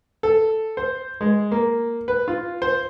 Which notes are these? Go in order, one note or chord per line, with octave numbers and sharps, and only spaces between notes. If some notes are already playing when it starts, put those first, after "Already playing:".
A4
C5
G#3
A#3
B4
F4
C5